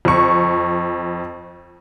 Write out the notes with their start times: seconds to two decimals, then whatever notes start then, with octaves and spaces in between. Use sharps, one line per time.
0.05 F2 C#6